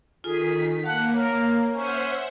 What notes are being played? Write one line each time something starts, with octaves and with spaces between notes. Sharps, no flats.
D#3 F4 G#4 A4 B6
A#3 F5 F#5 A5
A#4 C#5
C#4 C5 E5 F#5